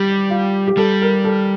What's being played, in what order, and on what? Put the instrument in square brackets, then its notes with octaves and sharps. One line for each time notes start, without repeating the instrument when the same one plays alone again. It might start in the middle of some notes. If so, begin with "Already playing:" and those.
Already playing: [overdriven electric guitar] G3 [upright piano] G4
[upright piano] F4
G4
[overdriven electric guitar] G3 [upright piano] A4
[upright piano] A#4
A4